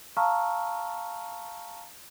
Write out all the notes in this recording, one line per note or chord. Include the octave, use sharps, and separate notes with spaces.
F5 A5 A#5 C#6 E6 F6